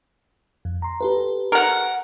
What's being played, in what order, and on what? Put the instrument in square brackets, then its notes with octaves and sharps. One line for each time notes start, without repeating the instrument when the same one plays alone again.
[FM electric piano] F2
A#5 C6
G4 A4 B4
[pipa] A#4 F#5